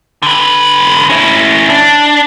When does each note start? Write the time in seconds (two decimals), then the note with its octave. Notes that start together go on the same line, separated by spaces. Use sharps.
0.22 D3 B4
1.10 C#4 E4
1.70 D4